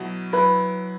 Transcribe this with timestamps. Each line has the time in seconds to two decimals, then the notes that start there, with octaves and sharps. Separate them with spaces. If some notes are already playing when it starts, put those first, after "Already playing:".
Already playing: B2 F#3 E4 F#4
0.33 F#3 E4 B4 B5